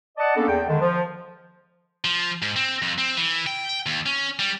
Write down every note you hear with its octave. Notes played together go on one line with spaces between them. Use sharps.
D5 D#5 F#5 A5
A#3 B3 C#4 D4 G#4 A4
E2 G5
D3 D#3 G#3
F3
F3
G#2
C4
F2
C4
E3
G5
D#2
C#4
G3